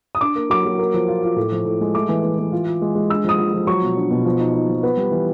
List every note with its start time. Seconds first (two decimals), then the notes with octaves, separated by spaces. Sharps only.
0.15 D#6
0.21 D4 D6
0.35 A#3
0.50 F#3 D6
0.65 F#3
0.79 A#3
0.94 F3
1.08 F4
1.23 F4
1.36 A2
1.52 F3
1.65 A2
1.81 G#3
1.95 A3 D6
2.09 E3
2.23 E3
2.38 E3
2.52 F4
2.67 F4
2.82 G#3
2.95 G#3
3.10 D4 E6
3.24 F3 D#6
3.38 F3
3.54 F3
3.67 F#3 C#6
3.82 B2
3.97 D4
4.11 B2
4.25 F3
4.40 D#4
4.54 D#4
4.69 F3
4.83 B3
4.97 G3
5.12 E3